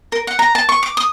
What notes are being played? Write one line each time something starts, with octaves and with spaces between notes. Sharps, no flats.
A#4
F#5
A#5
A5
C#6
D6
D#6